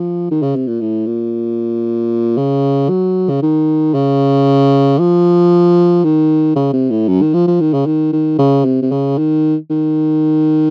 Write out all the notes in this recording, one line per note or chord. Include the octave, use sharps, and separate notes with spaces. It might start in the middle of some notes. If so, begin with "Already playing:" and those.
Already playing: F3
D#3
C#3
C3
A#2
A2
A#2
C#3
F#3
C#3
D#3
C#3
F3
D#3
C#3
C3
A2
F#2
D#3
F3
F3
D#3
C#3
D#3
D#3
C#3
C3
C3
C#3
D#3
D#3